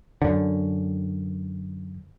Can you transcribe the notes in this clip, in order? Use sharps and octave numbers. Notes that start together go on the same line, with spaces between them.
F#2 D3